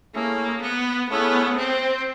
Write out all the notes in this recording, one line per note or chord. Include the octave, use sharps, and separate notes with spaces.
A3 A#3 C#4 E4 G#4
B3
A3 B3 C#4 E4 G#4
C4